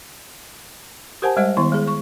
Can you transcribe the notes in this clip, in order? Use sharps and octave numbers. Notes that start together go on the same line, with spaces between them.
G4 A#4 C5 F#5 G#5 A5
G3 G#3 C5 D#5 F#5
D#3 B3 E4 C#6
G#3 G#4
C#6